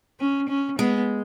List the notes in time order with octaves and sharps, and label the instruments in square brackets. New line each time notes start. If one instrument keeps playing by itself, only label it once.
[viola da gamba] C#4
C#4
[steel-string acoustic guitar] G#3 [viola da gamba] B3